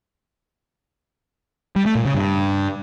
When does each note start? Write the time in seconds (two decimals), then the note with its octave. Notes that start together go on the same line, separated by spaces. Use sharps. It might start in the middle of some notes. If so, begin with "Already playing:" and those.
1.76 G3
1.86 A3
1.95 A#2
2.05 C#3
2.15 G2